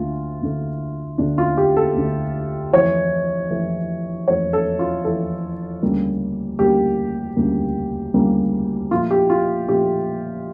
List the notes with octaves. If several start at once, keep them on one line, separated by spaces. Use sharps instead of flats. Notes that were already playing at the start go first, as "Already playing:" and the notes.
Already playing: D2 D3 A3 F4
D2 D3 A3
D2 D3 A3 D4
F4
G4
A4
D2 D3 A3
F2 E3 A3 C#5
F2 E3 A3
F2 E3 A3 C#5
A4
F4
F2 E3 A3 A4
D2 C#3 G3 A#3
D2 C#3 G3 A#3 G4
D2 C#3 G3 A#3
D2 C#3 G3 A#3
A#2 F3 A3 F4
G4
F4
A#2 F3 A3 G4